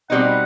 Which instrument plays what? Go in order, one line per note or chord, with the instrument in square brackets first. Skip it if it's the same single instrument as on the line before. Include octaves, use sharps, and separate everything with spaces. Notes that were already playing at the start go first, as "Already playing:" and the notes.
[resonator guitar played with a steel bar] B2 G3 C4 D#4 [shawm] F#5